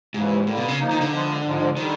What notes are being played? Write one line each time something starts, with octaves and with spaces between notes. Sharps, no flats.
D#2 G#2 C#3 E3
A2 D3 G3 A#3
B2
C#3
F3 A#3 D#4
D#3
D3
F3 G#3 B3
G#2 F3 G#3
D3 D#3 G3